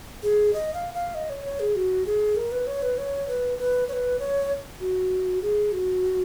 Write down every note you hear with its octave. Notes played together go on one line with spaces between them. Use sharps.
G#4
D#5
F5
F5
D#5
C#5
C#5
G#4
F#4
G#4
A#4
B4
C#5
B4
C#5
B4
B4
C#5
B4
C#5
F#4
G#4
F#4